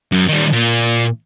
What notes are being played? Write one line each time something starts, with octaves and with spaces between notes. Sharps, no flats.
F#2
D#3 G3
A#2